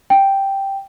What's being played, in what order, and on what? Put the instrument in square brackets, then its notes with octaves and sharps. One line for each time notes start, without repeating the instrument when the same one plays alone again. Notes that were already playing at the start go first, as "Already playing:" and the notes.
[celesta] G5